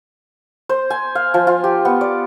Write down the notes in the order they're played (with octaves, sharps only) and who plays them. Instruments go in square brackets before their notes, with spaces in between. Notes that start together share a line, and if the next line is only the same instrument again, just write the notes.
[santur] C5
G#5
F5
F3
F4
G4
B3
D5